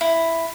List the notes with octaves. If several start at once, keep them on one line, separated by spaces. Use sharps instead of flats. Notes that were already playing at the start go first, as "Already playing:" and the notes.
E4